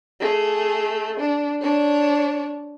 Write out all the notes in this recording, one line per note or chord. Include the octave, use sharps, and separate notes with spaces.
A3 G#4
D4
D4 C#5